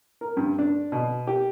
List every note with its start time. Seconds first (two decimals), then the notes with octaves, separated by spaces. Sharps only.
0.21 A#4
0.37 G2
0.59 D4
0.92 B2
1.27 G4